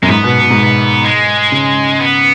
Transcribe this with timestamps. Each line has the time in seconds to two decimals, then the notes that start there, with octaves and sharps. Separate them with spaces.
0.03 F#2 G#3
0.08 G#2 B3
0.24 B2
0.40 B2
0.50 G#2
0.59 B2
1.04 G#3
1.52 C#3
1.99 B3